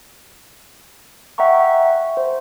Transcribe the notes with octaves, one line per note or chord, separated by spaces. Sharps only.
E5 F#5 G5 A#5 C#6
C5